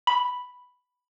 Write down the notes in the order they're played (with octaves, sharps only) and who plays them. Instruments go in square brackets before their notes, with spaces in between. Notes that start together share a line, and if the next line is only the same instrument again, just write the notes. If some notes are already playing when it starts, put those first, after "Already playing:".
[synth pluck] B5